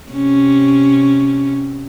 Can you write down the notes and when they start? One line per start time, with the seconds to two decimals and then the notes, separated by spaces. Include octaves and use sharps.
0.12 C3 C#4